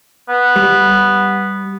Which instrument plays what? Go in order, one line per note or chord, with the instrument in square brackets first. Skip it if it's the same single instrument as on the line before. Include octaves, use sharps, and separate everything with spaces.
[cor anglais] B3
[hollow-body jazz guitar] G3